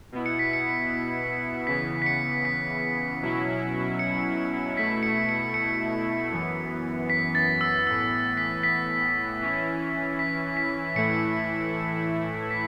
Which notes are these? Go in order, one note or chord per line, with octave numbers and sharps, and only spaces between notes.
B2 B3 E4
C#7
B6
C#7
C#3 E3 B3 B6
B6
C#7
B6
B2 F#3 C#4 E4
C#7
B2 A3 E4 B6
C#7
C#7
C#7
F#2 E3 B3
B6
A6
E6
A2 E3 B3 E6
B6
B6
E3 C#4 E4
B6
B6
A2 E3 A3 E4 C#7
B6